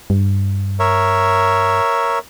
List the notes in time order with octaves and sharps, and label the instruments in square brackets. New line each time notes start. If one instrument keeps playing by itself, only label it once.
[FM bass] G2
[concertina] A#4 C#5 E5